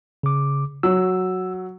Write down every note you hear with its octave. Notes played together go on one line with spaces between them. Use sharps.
C#3 D6
F#3 E6